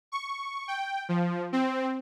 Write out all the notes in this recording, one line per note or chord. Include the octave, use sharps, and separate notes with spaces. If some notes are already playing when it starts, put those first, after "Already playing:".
C#6
G5
F3
C4